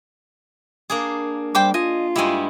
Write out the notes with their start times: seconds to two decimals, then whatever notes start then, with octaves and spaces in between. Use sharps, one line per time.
0.90 A#3 D4 G#4
1.55 G3 C5 G5 D6
1.74 F4 D#5 G#5
2.16 G2 G#3 E4 G4 G#5